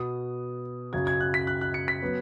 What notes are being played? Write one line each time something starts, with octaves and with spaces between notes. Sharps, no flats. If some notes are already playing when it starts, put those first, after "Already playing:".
Already playing: B2 B3 D#6
F#2 C#3 F#3 G#6
G#6
F#6
B6
F#6
F#6
C#7
B6
F#3 B3